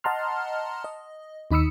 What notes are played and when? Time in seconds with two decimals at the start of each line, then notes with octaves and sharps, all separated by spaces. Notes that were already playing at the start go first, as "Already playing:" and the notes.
0.04 D#5 F#5 A5 A#5 C6 F6
0.84 D#5
1.51 D#2 D#4 B5 D#6 E6 C#7